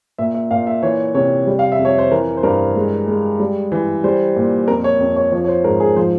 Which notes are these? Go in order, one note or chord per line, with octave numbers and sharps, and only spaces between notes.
A#2 E5
E5
A#2 F5
E5
E3 C#5
C3 C#5
G3
F5
E5
F2
C#5
C5
E3 A#4
C5
G2 A#4
G#3
G#3
G3
E3
G3 C5
A#2
F2 A#4
C#5
F2
C#5
F3 C#5
C#5
C5
G#2 A#4
G#4
F3 C5